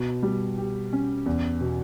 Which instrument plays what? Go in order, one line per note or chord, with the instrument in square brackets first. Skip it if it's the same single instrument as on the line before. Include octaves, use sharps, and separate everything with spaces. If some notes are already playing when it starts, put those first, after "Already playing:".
Already playing: [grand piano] B2
G3
G4
C#4
E2
B2